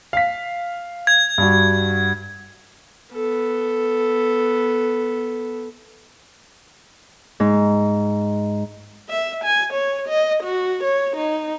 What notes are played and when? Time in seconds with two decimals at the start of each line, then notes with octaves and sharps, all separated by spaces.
0.13 F5 B6
1.07 G#6
1.38 G2 F#4
3.14 B3 A4
7.40 G#2
9.09 E5
9.44 G#5
9.74 C#5
10.08 D#5
10.43 F#4
10.84 C#5
11.17 D#4